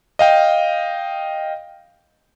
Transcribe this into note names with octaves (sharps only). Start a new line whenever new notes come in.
D#5 F5 G5